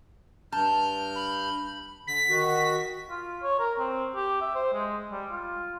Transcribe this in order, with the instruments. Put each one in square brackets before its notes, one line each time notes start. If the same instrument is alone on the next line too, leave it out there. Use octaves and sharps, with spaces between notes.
[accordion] G2 F6 G6 [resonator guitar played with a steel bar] A5
[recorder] B5
[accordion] D3 [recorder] B6
[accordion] D#3 F#4
[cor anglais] F4
C#5
A#4
C4
G4
E5
C5
G#3
G3
F4